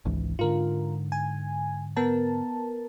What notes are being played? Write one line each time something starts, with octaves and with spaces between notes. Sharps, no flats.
G#1 C#2 E3
G#2 D3 F4 A#4
G#5
B3 A#4 A5